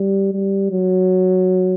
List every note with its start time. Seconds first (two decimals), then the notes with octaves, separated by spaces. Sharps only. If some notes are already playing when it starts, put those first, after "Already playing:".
Already playing: G3
0.33 G3
0.71 F#3